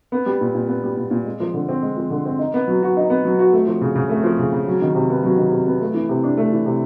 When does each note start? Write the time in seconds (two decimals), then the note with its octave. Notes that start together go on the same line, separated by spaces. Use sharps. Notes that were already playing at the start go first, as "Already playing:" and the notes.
0.12 B3
0.26 G3
0.41 A#2
0.55 A#2
0.68 B3
0.84 G3
0.97 A#2
1.11 A#2
1.25 G#3
1.40 F3
1.54 D3
1.69 C4
1.82 G#3
1.97 F3
2.10 D3
2.26 C4
2.39 D#4
2.54 B3
2.68 F#3
2.83 F#4
2.97 D#4
3.10 B3
3.25 F#3
3.39 F#4
3.53 A3
3.67 F3
3.81 C#3
3.95 C#3
4.09 A3
4.24 F3
4.39 C#3
4.52 C#3
4.67 F#3
4.82 D#3
4.95 C3
5.10 B3
5.24 F#3
5.37 D#3
5.52 C3
5.67 B3
5.81 A3
5.94 E3
6.09 C3
6.24 D4
6.37 A3
6.52 E3
6.66 C3